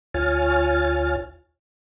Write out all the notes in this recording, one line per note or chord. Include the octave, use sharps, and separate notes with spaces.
D2 F4 C#5 G#5 F6 A6